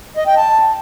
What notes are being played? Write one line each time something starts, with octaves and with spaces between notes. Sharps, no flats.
D#5
G5
A5